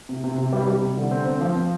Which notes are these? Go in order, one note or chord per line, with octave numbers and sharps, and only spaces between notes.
C3
C3
C3
G3
G3
C3
D3
C4
C4
F3
C4